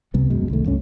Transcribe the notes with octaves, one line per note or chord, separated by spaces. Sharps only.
C2 C3 G3 B3
D#1 F#2 B2 G#3
C2 D#3 A3
C#2 G2 A3 C#4